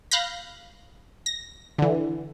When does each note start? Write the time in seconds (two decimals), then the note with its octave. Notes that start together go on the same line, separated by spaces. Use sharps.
0.11 F5 B5 F#6 G6 A#6
1.26 A#6
1.78 D3 E3